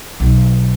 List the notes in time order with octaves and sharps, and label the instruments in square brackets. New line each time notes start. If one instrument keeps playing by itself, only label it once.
[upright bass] B1